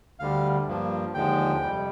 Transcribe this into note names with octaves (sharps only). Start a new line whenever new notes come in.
D2 D3 G3 F5
G2 F3 A#3
D#2 D3 F3 G#3 G5
F2 C3 G3